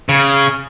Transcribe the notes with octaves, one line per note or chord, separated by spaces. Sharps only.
C#3